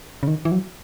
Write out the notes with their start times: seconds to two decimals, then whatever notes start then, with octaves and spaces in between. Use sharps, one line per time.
0.23 C#3
0.27 D#3
0.45 E3
0.52 F#3